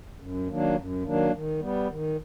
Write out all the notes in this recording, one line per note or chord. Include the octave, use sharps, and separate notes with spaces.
F#2
D#3 F#3 A#3 D4
F#2
D#3 F#3 A#3 D4
D#3
G3 B3
D#3